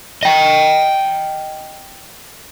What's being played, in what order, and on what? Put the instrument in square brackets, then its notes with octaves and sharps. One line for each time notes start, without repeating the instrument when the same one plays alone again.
[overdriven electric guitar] D#5 G5